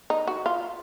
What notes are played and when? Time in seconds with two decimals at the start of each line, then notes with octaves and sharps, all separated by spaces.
0.10 D#4
0.27 F#4
0.46 F4